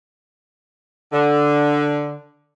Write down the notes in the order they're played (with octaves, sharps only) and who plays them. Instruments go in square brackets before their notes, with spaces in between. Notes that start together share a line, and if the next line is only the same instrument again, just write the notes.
[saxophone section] D3